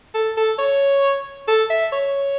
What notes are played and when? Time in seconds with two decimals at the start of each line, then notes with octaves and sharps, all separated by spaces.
0.14 A4
0.37 A4
0.58 C#5
1.48 A4
1.70 E5
1.92 C#5